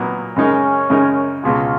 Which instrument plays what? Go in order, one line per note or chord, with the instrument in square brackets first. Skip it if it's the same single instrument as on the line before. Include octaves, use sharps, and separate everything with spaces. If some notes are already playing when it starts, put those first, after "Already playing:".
Already playing: [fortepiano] A#2 F#3 A#3 D#4 [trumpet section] B3
[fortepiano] F#2 C#3 G#3 D#4 A#4 [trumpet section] C#4
[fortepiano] F#2 C#3 G#3 D#4 A#4
[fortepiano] C#2 B2 G#3 [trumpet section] F4